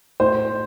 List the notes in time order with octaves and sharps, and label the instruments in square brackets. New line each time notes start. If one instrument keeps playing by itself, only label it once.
[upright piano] A2 C5